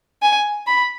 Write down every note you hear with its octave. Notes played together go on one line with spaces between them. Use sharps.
G#5
B5